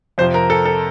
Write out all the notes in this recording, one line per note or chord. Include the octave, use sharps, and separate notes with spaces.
F2 C3 F3 C5
A#4
A4
A4